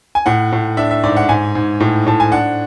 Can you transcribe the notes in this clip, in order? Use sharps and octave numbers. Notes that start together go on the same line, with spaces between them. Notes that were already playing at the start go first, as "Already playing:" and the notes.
G#5
A2 F#5
A2
D4 E5
E5
G#2 D5
F#5
G#2 G#5
G#2
A2
A2 A5
G#5
D4 F#5